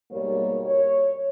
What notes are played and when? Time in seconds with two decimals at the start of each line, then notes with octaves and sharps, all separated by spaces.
0.11 G#2 B2 G3 A#3 A#4 C#5
0.64 C#5